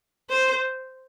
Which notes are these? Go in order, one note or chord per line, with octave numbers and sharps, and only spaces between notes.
C5